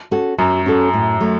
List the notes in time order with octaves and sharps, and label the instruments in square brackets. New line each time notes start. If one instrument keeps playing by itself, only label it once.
[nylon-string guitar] C#4 F#4 A4
[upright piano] F#2 [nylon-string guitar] F#3
[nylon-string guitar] C#4 F#4 A4
A2
F#3 A3